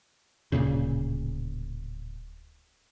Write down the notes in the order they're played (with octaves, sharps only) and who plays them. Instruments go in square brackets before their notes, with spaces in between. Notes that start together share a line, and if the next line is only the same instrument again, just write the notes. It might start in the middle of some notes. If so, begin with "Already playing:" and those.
[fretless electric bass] D1 A#1 A#2 C#3